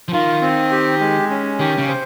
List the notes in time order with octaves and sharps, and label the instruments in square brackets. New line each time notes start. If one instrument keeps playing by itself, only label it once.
[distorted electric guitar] F3
[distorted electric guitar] D#3 [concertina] F4
[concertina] C4
G4
G#3
C#4
[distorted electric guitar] D#3 [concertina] G4
[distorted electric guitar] C#3
[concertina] C5